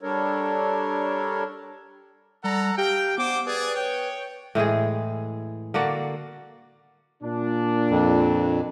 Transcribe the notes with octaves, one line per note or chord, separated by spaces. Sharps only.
G3 D4 A4 A#4 C#5
G3 A4 F#5 A#5
G4 F5 G5
B3 D4 C5 D6
G#4 B4 D5
C#5 G5
A2 E3 G#3 G#4
D3 A#3 F#4 D5
A#2 D4
F2